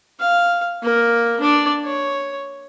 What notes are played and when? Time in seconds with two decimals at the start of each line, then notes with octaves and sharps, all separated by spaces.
0.20 F5
0.83 A#3 A#4
1.40 D4 D5
1.85 C#5